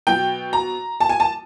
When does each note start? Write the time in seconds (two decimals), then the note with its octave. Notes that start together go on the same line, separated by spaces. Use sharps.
0.07 B2 F#3 G5
0.53 A#5
1.00 A5
1.09 G#5
1.20 A5